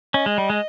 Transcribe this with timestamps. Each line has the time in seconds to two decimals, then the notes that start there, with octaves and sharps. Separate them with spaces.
0.14 C#4 D#5
0.26 G#3
0.38 G3
0.50 G#3